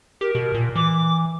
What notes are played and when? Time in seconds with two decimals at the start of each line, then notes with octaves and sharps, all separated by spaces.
0.21 G4 A#4
0.35 B2
0.54 A#2
0.75 E3 D6